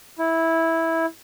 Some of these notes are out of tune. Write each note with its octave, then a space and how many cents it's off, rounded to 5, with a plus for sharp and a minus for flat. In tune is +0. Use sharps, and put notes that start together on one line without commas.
E4 -10